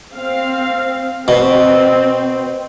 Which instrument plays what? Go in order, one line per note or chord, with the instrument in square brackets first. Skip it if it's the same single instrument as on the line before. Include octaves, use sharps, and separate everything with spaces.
[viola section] C4 F5
[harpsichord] B2 [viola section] C4